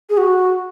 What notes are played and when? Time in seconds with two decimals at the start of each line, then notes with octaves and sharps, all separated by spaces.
0.10 G#4
0.17 F#4